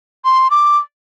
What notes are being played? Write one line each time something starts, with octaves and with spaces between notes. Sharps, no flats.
C6
D6